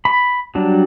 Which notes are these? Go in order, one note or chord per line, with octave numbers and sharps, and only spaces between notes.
B5
F#3 G3 D4